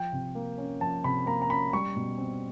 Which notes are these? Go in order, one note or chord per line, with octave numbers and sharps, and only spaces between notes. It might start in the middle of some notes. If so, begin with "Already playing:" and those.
Already playing: F3 G5
C3
A#3
C#4
F3 A5
C3 B5
A#3 A#5
A#5
C#4 B5
G3 C#6
B2
C4